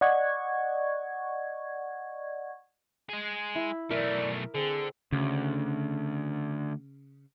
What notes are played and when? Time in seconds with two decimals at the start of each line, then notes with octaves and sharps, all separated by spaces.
0.01 D5 D#5 F#5 C#6 G#6
3.09 G#3 G#4
3.55 E4
3.90 B1 E3 A3 A#4 D5 E5 D6
4.55 D3 C4 G#4
5.12 D2 C#3